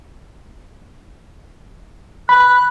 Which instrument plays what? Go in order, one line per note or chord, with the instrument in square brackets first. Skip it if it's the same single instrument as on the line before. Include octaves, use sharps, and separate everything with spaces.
[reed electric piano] B5 [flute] F#6